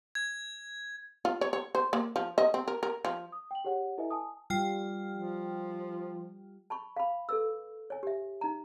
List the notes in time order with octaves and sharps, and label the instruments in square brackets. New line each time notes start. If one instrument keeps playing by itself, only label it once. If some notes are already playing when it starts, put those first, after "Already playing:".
[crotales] G#6
[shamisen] F4
C#5
C#5
C5
A#3
F3
D#5
C4
A#4
A#4
F3
[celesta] D#6
G5 F#7
G4 G#4 C#5 F#5
E4 A4 B4 D#5 E5 G#5
G#5 A5 D#6
[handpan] G3 F4 [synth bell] G5 F6
[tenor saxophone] F3
[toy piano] A5 B5 C#6
F5 B5
A4 B4 E6
C#5 G#5
G4 E5
D#4 A#5